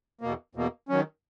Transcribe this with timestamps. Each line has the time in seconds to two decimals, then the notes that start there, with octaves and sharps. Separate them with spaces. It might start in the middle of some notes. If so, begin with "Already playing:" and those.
0.21 E2 B2 A#3
0.55 E2 B2 A#3
0.89 D#3 F#3 C#4